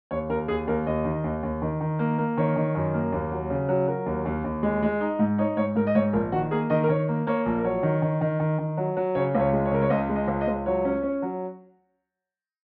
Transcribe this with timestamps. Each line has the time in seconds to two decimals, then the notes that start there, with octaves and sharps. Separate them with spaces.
0.11 D#2 C#5
0.29 D#2 A#4
0.48 D#2 G#4
0.67 D#2 A#4
0.87 D#2 D#5
1.05 D#3
1.24 D#2
1.43 D#2
1.62 D#3
1.81 D#3
1.99 A#3
2.18 A#3
2.37 D#3 C#5
2.56 D#3
2.75 F#2
2.94 A#3
3.12 D#2
3.31 F#3
3.50 C#3
3.69 F#3
3.88 F#3 A#4
4.06 D#2
4.25 D#2
4.44 D#2
4.63 G#3
4.82 G#3
5.00 D#4
5.19 G#2
5.38 D#4 C#5
5.57 G#2 C#5
5.75 G#2 A#4
5.87 D#5
5.95 G#2 C#5
6.13 A#1 A#4
6.32 D#3 F#4
6.51 A#3 G#4
6.70 D#3 D#5
6.84 A#4
6.89 D#3 C#5
7.08 A#3
7.27 A#3 C#5
7.46 A#1
7.58 A#4
7.64 F#3 C#5
7.83 D#3
8.02 D#3
8.21 D#3
8.40 D#3
8.59 D#3
8.77 F#3
8.97 F#3
9.15 C#3 C#5
9.35 C#2
9.40 C#5
9.53 G#3
9.65 C#5
9.71 C#3 A#4
9.82 C#5
9.90 C#2 D#5
10.09 G#3
10.15 D#5
10.28 C#2
10.41 D#5
10.47 C#2
10.66 F#3 C#5
10.85 C#4
11.03 C#4
11.22 F#3